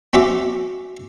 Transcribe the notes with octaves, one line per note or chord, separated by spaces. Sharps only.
C4 C#4 F#4 E5 D6